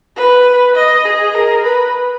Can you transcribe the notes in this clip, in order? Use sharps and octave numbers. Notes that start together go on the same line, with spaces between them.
B4
D#5
G#4
A#4
B4